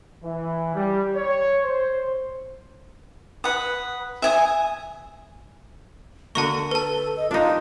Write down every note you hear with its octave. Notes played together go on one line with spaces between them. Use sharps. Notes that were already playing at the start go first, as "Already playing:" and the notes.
E3
G3
C#5
C5
B4 F#5 D#6
E5 G#5 D#6
D3 A#3 F#4 A5 A#5 C#6
A4 B4 A5
D#5
D4 D#4 F4